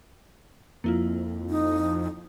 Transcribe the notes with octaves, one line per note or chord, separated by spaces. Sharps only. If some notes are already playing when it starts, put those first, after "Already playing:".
F2 A#3 E4 F4
D#4